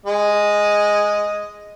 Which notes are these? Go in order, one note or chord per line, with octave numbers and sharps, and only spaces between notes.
G#3 D#5